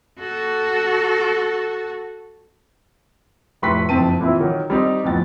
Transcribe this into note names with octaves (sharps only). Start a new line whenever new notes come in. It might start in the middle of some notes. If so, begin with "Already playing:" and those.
F#4 A4
F1 A2 B4 C6 C#6 B6
F#1 F2 C4 A5 D#7
A#2 E3 C4 E4
D#3 F#3
G3 C4 D#4
D1 F2 B3 A6